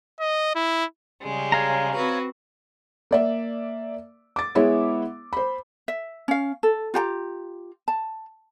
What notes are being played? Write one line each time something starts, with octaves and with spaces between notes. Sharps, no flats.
D#5
E4
C#3 G3 G#3
C#5 F5 A#5
C4 F#4 B4
A#3 D5 E5
D6 A6
G#3 B3 E4 G#4 C#5 E5
C5 B5
E5
C#4 F5
A4
F4 G4 G5 A#5
A5